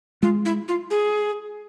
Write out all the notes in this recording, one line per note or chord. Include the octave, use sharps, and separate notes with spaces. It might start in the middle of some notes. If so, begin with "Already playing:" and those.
G#3 F4
E4
F4
G#4